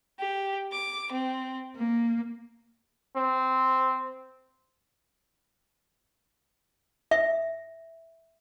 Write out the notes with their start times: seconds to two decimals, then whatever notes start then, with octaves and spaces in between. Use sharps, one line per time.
0.20 G4
0.72 D6
1.12 C4
1.76 A#3
3.16 C4
7.11 E5